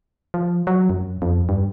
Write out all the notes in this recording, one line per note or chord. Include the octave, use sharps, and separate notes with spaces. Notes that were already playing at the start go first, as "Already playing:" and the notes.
F3
F#3
F#2
F2
G2